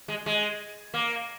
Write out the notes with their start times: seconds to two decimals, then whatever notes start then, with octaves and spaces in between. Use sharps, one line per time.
0.08 G#3
0.26 G#3
0.94 A#3